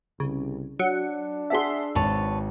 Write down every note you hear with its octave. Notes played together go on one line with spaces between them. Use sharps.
C2 C#3
F#3 D4 F#5
G#4 E5 F#5 A5 C6
G#1 B4 C#5 A5